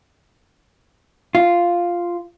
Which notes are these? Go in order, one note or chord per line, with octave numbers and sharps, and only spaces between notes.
F4